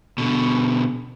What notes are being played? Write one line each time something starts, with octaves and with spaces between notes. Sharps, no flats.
B2 D3